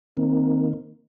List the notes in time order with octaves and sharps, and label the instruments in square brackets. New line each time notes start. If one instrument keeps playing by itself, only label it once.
[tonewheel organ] D#3 A#3 [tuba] C4